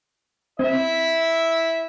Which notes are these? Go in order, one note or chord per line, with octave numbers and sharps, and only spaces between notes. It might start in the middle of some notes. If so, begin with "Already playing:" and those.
C4 E4 E5